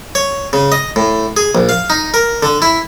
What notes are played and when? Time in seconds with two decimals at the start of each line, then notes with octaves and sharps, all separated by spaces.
0.15 C#5
0.53 C#3
0.72 D#5
0.96 A2
1.37 G#4
1.55 A#1
1.69 F5
1.90 D#4
2.14 A#4
2.43 D3
2.62 E4